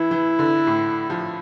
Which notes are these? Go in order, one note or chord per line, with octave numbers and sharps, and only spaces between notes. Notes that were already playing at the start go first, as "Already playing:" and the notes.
Already playing: E3 E4
E3
D3
A2
F3